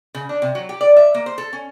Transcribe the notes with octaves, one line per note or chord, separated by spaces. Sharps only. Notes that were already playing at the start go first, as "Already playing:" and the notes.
C#3
D4
C3
F#3
G4
D5
E5
A#3
C5
A4
C#4